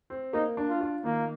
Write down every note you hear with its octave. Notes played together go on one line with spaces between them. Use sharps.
C4
A#3 D#4
D4
F4
F4
D#3 A#3